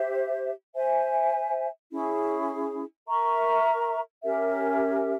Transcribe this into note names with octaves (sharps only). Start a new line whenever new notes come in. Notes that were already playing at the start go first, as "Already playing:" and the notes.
Already playing: G4 C5 E5
C5 E5 G#5
C#4 E4 G#4
A#4 E5 A#5 C#6
C#4 G4 A#4 E5